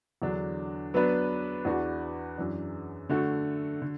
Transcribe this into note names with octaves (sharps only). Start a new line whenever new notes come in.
E2 D3 F#3 D4
F#3 B3 D4 B4
E2 E3 D4 F#4 B4
F#2 E3 D4
D3 A3 F#4 A4
D3